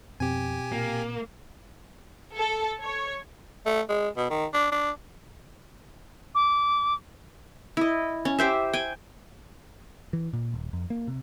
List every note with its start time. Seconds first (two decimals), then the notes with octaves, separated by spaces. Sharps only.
0.20 F2 B2 C4 G4 G#5
0.72 A#2 A#3
2.34 A4
2.82 C#5
3.66 A3
3.89 G#3
4.17 B2
4.30 D#3
4.54 D4
4.72 D4
6.35 D6
7.77 E4 D#5
8.25 C#4
8.39 G4 C5 E5
8.73 G5 G#5
10.13 E3
10.33 A#2
10.54 D#1
10.73 F2
10.90 A#3
11.08 C3